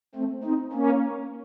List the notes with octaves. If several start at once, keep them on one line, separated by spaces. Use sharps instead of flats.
A3 C4
C4 D#4
A#3 C#4